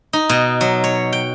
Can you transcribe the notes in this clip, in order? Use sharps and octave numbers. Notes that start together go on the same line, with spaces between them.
D#4
B2
F#3
C#5
G5